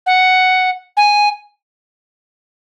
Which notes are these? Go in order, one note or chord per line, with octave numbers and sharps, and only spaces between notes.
F#5
G#5